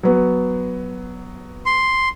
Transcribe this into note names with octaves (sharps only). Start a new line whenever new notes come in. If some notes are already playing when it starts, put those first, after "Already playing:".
F#3 B3
C6